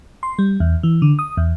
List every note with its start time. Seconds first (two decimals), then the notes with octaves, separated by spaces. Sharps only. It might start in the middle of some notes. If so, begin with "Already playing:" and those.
0.23 C6
0.39 G3
0.60 E2
0.83 E3
1.02 D3
1.19 D#6
1.37 E2